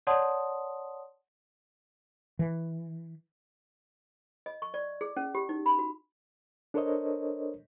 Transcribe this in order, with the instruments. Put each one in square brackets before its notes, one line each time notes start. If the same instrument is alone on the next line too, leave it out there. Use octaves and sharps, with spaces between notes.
[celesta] C#5 D5 F#5 A5 C6 D#6
[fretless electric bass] E3
[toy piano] D#5
C#6
D5
G#4
C#4
G4
D#4
B5
F#4
[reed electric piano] D4 A4 A#4 C5 C#5 D#5